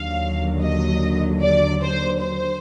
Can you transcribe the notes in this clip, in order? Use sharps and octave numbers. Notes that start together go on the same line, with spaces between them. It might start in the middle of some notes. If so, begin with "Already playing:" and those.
Already playing: D#2 D3 F#3 F5
D#5
D5
C5
C5